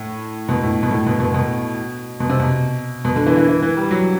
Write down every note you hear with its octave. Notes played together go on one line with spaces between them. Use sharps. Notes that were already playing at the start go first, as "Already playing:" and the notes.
Already playing: A2
B2
A2
B2
A2
B2
B2
B2
B2
C3
B2
B2
D3
E3
E3
E3
E3
G3
F#3